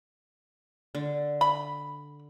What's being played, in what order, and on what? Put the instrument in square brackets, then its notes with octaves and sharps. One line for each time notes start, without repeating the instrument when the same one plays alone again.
[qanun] D3
[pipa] B5